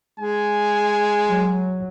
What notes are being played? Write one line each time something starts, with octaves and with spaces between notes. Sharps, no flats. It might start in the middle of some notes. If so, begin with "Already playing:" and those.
G#3 G#5
F#3